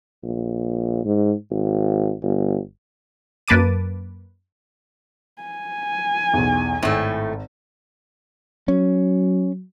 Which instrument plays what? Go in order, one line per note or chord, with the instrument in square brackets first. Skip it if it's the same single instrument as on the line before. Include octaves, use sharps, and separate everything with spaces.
[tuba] A#1
G#2
G#1
G1
[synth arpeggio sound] F#2 A#3 B4 A5 D6 D#7
[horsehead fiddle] G#5
[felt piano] B1 E2
[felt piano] G#1 [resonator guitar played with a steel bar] A2 A3
[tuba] F#3 [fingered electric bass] C#4